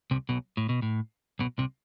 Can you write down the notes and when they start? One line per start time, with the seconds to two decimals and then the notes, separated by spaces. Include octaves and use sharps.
0.11 C2 C3
0.29 B1 B2
0.57 A2
0.69 B2
0.82 A2
1.39 B1 B2
1.58 C2 C3